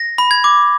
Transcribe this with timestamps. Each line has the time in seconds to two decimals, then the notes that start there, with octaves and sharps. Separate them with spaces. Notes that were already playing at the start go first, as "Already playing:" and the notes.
Already playing: A#6
0.18 B5
0.31 G#6
0.44 D6